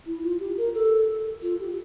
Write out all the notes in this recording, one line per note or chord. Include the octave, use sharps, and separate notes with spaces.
E4
F4
G4
A#4
A4
F4
G4